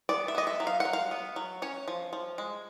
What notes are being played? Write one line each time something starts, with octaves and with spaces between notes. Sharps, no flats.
B3 D5
E5
B3 D#5
E5
F#3
F5
F#5
F#3
F5
B3
F#3
C#4 C#5
F3
F3
G#3